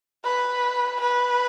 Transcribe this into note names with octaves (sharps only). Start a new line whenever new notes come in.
B4
B4